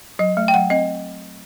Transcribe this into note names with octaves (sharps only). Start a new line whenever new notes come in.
F#3 D#5
A3
G5
F#3 F#5
C4 D#5